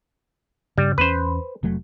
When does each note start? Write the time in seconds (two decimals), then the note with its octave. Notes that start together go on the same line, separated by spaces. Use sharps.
0.78 G2 C#3 G3
0.98 E2 B3 C#4 B4 C5
1.63 F1 F#3 A3